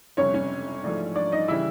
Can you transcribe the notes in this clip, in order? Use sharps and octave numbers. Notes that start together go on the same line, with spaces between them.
G1 F2 C3 C#4 C#5
C#4 C#5
A1 G#2 F3 A3 D4
D4 D5
D#4 D#5
C#3 E3 G3 E4 E5